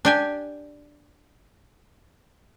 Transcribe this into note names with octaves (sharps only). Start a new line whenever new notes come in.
D4 G4 G#5